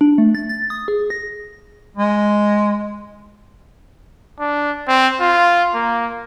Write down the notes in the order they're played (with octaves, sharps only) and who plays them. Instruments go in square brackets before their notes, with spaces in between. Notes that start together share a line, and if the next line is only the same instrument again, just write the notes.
[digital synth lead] D4
A3
A6
A6
D#6
G#4
A#6
[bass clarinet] G#3
[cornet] D4
C4
F4
A#3